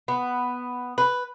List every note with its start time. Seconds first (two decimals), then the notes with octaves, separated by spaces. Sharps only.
0.08 B3
0.98 B4